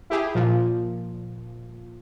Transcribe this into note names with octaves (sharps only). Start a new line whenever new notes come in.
E4 G4 G#4
A#2 F3